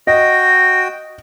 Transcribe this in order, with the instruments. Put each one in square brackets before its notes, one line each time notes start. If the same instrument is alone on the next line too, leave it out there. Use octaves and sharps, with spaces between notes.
[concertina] F#4 G5 [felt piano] D#5 [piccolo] A#6